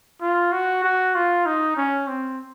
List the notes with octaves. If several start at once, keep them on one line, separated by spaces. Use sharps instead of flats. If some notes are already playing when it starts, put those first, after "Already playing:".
F4
F#4
F#4
F4
D#4
C#4
C4